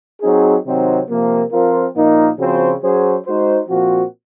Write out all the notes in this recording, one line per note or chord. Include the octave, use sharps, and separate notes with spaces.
F#3 C4 D#4 G#4
C3 D#3 F#3 C4 D#4
C3 F3 A#3
F3 C4 F4 A#4
A#2 F3 A#3 D#4
C#3 F3 C4 F#4 C5
F#3 C#4 G#4 C5
G#3 D#4 F#4 C5
A#2 F3 C4 F#4